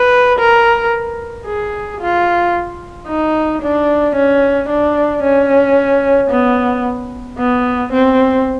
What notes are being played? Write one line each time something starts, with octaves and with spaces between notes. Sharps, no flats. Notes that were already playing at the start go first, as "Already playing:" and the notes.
Already playing: B4
A#4
G#4
F4
D#4
D4
C#4
D4
C#4
B3
B3
C4